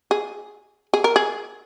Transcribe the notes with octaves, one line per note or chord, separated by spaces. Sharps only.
G#4
G#4
A#4
G#4